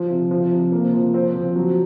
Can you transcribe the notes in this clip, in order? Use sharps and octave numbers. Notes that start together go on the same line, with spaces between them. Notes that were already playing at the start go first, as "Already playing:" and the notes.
Already playing: F3
C3
F3
C3
A#3
F3
C4
F3
F#3